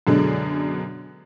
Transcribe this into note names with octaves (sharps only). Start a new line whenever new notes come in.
F#2 B2 D3 F#3 G#3 D4